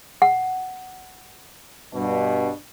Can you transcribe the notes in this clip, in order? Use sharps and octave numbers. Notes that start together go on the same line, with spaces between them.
F#5
G2 B2